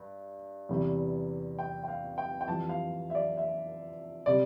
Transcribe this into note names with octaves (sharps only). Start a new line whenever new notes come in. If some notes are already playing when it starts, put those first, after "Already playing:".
Already playing: G2
E2 C3 E3 G3
G5
G5
F5
G5
G5
F2 E3 G3 A5
F5
E5
D5
E5
C3 G3 D5